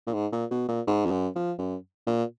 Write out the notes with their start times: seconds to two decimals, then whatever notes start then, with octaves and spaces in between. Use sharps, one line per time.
0.07 A#2
0.14 G#2
0.32 A#2
0.51 B2
0.68 A#2
0.87 G#2
1.05 F2
1.11 F#2
1.35 F3
1.59 F#2
2.07 A#2